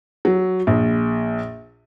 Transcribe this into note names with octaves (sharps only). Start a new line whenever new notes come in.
F#3
A#1